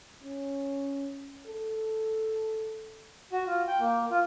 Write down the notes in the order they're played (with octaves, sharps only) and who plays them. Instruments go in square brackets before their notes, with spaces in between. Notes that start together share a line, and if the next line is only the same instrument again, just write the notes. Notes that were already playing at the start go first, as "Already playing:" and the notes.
[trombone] C#4
A4
[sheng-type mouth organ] F#4
F4
G5
A#3
F4